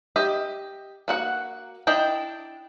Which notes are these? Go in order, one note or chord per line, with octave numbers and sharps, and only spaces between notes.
G4 D#5 E5
A#3 F#4 F#5
D4 E4 D#5 G5